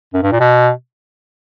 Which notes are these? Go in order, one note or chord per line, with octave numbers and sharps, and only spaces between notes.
F#2
G2
A#2
B2